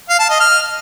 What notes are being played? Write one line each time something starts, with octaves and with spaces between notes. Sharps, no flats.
F5
A5
D#5
F6